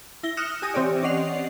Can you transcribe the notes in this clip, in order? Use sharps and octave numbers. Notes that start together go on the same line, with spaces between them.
E4 A#6 G7
D#6 F6 F#6 A#6 C#7 E7
G4 G#5 D#6 A#6
E3 C4 G4 C#5 D5
C#4 D5 D#5 F#5 C7 F7